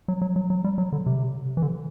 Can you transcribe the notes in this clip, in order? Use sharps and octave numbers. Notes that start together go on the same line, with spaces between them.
F#3
F#3
F#3
F#3
G3
F#3
D3
C3
E3
D3